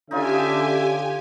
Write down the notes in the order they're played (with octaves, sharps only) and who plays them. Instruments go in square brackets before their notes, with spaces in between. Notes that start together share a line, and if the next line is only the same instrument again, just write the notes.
[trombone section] D3 [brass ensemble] C#4 E5 [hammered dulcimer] D#4 F4 [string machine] G4 G#5